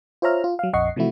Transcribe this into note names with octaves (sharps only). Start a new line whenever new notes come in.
F4 C5 C#5 E5 A#5 F6
F4
F#3 F5
A#1 F2 D#5 F#5 C#6 C7
C3 E3 F3 A3 E4 F#4